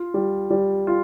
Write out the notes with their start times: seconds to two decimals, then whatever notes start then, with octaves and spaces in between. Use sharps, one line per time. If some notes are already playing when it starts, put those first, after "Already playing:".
Already playing: F4
0.14 G3
0.50 G3
0.87 F4